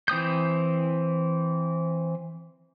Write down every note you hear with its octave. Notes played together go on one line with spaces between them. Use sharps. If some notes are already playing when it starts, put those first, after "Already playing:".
E3 C4 D#6 G6